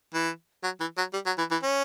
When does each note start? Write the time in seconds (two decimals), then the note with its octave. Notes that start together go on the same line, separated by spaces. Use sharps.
0.14 E3
0.64 F#3
0.80 E3
0.98 F#3
1.13 G3
1.26 F#3
1.38 E3
1.51 E3
1.63 C#4